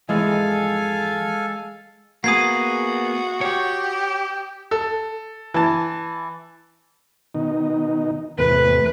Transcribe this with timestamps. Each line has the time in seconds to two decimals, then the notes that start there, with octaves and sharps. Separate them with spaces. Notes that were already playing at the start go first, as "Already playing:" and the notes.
0.09 F2 G#2 E3 G#3 A4 F5 G#5
2.24 A#3 B3 F#4 G#4 D#6 G#6 C7
3.41 G4 C#5
4.71 A4
5.54 E3 A5
7.35 B2 D#3 D#4
8.38 E2 A2 C3 B4